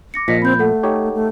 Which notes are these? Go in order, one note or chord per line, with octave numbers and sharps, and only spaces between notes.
D6 A#6 C#7
A#2 F3 D#5 A#6 B6 C#7
C4 B5 G6
A3 A4 F#5
D#4 G4 C#5
A3